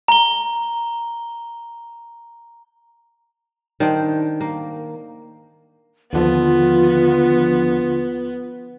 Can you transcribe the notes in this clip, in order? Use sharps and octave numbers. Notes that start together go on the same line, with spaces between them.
A#5 G7
D#3 D4 C5 G5
A#3
D#2 D3 F3 B3 F4